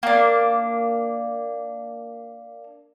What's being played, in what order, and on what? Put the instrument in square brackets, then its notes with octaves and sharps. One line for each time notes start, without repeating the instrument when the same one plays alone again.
[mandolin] A#3 D4